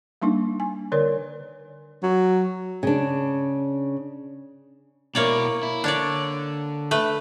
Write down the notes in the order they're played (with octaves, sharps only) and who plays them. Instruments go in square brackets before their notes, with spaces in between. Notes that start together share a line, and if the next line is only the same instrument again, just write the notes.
[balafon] G3 A#3 D4 D#4
G#5
D3 A#4 C#5 D5
[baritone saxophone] F#3
[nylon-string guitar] C#3 D4
[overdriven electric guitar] B2 E4 [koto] A#3 C#5 D5
[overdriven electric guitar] E4
[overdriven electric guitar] D3 [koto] D4 C#5 D5
[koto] A3 B4